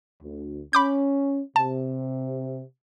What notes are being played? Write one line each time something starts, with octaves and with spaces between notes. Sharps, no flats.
D2
C#4 B5 D6 G6
C3 A5